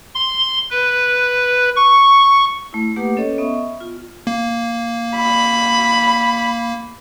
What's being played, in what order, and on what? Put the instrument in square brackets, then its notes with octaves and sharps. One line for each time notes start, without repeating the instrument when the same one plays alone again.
[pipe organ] C6
B4
C#6
[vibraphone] A3 E4
A3 A#3 G4 B4 F#5 D6
C#4 A4 C#5 D#5
B3 D#5 E5 C#6 D#6
F4
[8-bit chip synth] A#3
[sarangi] B5